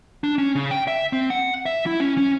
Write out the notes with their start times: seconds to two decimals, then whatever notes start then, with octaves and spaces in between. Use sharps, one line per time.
0.24 D4
0.38 C#4
0.55 C#3
0.71 G5
0.88 E5
1.13 C4
1.30 F#5
1.66 E5
1.86 E4
2.00 C#4
2.17 C#4